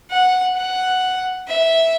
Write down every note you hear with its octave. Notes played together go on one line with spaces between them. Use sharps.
F#5
F#5
E5